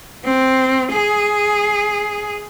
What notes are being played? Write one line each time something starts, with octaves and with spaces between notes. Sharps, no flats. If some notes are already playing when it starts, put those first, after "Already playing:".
C4
G#4